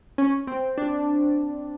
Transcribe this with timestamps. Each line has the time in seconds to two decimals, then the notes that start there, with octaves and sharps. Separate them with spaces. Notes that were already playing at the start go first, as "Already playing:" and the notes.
0.18 C#4
0.47 C4
0.78 D4